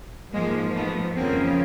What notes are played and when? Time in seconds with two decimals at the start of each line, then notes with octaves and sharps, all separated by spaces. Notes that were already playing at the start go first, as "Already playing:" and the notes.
0.33 G#2 F3 G#3 A#3
0.75 A3 B3
1.16 F2 C#3 F3 A#3 C4